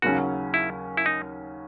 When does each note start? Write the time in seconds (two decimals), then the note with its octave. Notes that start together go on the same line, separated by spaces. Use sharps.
0.02 D#2 C#3 F#3 C#4 F#4
0.54 E4
0.97 E4
1.06 D#4